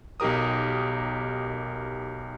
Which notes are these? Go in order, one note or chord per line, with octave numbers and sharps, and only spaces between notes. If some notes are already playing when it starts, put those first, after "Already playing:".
B1 D#4 G4 A#4 D#6